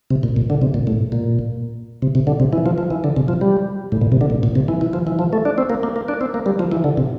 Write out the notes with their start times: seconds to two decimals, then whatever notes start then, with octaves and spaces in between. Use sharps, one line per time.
0.10 C3
0.23 A#2
0.36 A#2
0.50 D3
0.62 C3
0.74 A#2
0.87 A2
1.12 A#2
2.02 C3
2.15 C3
2.27 D3
2.40 C3
2.53 E3
2.66 F3
2.78 F3
2.90 E3
3.04 D3
3.17 C3
3.28 F3
3.41 G3
3.92 A2
4.01 A#2
4.12 C3
4.21 D3
4.30 A#2
4.43 A#2
4.55 C3
4.68 E3
4.81 E3
4.93 F3
5.07 E3
5.19 F3
5.33 A3
5.45 D4
5.58 C4
5.70 A#3
5.83 A#3
5.96 A#3
6.08 D4
6.21 C4
6.34 A#3
6.46 G3
6.59 F3
6.72 E3
6.84 D3
6.97 C3